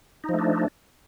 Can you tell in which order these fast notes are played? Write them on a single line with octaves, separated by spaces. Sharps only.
D#4 F3 A3 D4